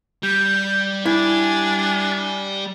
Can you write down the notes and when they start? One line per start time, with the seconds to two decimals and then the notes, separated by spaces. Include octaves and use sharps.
0.23 G3 G6
1.06 D4 E4 G#5